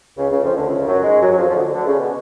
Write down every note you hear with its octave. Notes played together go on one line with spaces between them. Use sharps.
C#2 C#3
C#2 C#3
F2 F3
D2 D3
C#2 C#3
F#2 F#3
G#2 G#3
F#2 F#3
F#3
F2 F3
F3
D2 D3
D2 D3
C#3
B2